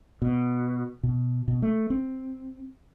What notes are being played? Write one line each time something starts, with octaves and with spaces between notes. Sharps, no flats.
B2
B2
B2
A3
C4